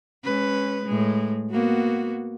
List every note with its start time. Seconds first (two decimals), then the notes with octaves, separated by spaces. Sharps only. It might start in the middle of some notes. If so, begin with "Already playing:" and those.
0.24 G#3 C#4 B4
0.86 A2 G#3
1.51 A#3 B3 F#4